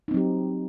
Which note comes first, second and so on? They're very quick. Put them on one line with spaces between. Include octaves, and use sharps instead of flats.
D#4 C4 F#3 G4